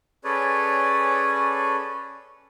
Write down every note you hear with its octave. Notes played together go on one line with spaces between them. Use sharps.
C#4 G#4 A4 B4 C#5 D5